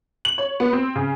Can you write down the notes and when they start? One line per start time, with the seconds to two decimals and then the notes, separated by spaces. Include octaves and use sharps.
0.25 F#7
0.38 C#5
0.60 B3
0.73 C4
0.96 C#3